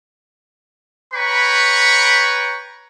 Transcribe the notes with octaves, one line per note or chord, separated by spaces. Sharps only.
B4 C#5 G5 A#5 B5 C#6